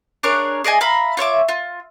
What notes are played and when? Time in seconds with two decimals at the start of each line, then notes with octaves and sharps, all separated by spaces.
0.23 D4 G#4 A#4 C#5
0.64 G#4 D5 D#5 G#5
0.81 E5 F5 A#5 B5
1.17 F4 C#5 E5 D6
1.48 F4